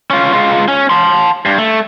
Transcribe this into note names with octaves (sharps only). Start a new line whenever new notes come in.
C#4 F4
G#3 F4
C#4
A5 C6
G2
A3